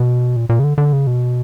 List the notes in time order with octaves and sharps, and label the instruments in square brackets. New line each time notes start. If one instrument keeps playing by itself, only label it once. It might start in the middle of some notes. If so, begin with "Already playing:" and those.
Already playing: [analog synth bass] B2
A#2
A#2
C#3
D3
D3
C#3
B2